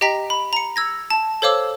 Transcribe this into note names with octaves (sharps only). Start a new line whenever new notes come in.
G4 D#5 G5 A#5 B6
B5
A#5 C#7
E6 G#6 A#6
A5
A4 C5 C#5 F5 D6 E6